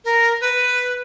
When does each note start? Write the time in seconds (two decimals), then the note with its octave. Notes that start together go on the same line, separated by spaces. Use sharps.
0.05 A#4
0.41 B4